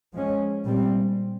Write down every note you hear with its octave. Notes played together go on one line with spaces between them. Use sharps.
F3 G#3 C#4
A#2 G3 C4